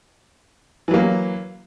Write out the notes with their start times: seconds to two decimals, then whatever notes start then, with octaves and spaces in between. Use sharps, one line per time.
0.88 E3
0.91 F#3
0.94 A#3